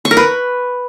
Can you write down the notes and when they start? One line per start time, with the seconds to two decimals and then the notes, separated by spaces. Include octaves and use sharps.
0.05 C#6
0.11 A#4
0.17 B4